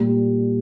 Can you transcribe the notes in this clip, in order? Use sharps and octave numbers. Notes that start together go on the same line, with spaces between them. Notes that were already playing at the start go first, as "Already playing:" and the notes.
Already playing: A#2 G3